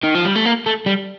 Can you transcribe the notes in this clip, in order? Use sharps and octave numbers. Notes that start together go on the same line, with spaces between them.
D#3
F3
G3
A3
A#3
A3
G3